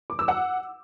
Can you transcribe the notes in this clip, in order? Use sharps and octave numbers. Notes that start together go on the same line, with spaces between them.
D6
E6
F#5